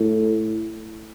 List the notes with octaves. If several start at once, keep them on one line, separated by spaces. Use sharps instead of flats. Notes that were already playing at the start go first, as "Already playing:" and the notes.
Already playing: A2